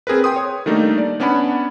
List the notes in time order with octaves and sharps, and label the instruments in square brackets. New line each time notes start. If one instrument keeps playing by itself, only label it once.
[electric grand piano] C4 G#4 A#4 B4
G5 C6 D#6
C#5
D#3 G3 A3 A#3 D4 D#4
D5
B3 C#4 D4 D5 F#5 B5